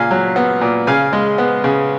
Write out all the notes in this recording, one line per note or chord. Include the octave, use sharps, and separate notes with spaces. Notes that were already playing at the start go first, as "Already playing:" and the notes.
Already playing: A#2 C#3 F5 G#5
F#3
B3
A#2
C#3 F5 G#5
G#3
B3
C#3